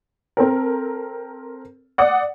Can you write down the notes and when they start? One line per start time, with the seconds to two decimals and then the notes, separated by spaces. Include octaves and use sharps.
0.37 C4 A4 A#4
1.98 D5 F#5 D#6